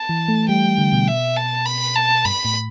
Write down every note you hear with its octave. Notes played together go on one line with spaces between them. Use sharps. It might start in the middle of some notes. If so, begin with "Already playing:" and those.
Already playing: A5
E3
A3
G3 G5
D3
B2
E5
A5
B5
A5
G2 B5
A2